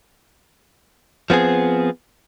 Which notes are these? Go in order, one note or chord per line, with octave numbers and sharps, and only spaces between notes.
F3 B3 C4 G#4